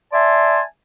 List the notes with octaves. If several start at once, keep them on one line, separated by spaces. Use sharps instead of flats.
D5 E5 G#5 A5 C6